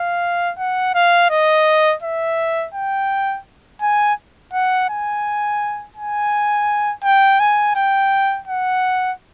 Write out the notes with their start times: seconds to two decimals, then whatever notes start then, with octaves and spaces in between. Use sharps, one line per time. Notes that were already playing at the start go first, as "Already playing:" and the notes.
Already playing: F5
0.58 F#5
0.95 F5
1.30 D#5
2.02 E5
2.74 G5
3.81 G#5
4.53 F#5
4.89 G#5
5.97 G#5
7.04 G5
7.40 G#5
7.76 G5
8.48 F#5